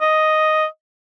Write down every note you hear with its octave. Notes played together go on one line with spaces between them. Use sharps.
D#5